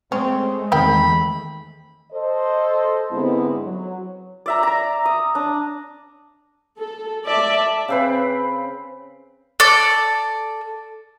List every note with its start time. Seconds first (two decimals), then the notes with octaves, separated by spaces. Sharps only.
0.12 G#3 A3 C4 C#4
0.72 E2 D#3 C4 A#4 G5 B5
2.12 A4 C5 D#5
3.11 G#2 D3 G#3 B3 C4 E4
3.63 F#3
4.46 D5 E5 A#5
4.63 D5 A#5
5.05 D#6
5.35 D4
6.78 A4
7.26 D5 E5 A5
7.88 C#3 C4 B4
9.60 A4 D5